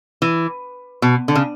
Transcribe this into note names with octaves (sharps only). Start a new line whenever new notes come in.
E3
B2
D3
C#3